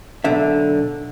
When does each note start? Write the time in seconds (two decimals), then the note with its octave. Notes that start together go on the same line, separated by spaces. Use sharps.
0.24 B1 D3 E5